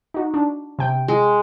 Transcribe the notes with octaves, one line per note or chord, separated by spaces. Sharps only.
D#4 F#4
D4
C3 G5
G#3